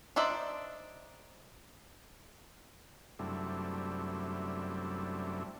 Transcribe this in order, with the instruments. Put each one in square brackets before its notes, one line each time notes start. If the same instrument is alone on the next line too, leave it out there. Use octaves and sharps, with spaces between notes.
[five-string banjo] D4 D#4 C5 D5 E5
[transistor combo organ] F#2 C3 G3 A3 D4 E4